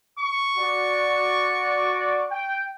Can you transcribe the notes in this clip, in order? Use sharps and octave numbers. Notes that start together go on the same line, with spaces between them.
C#6
F#4 D5
G5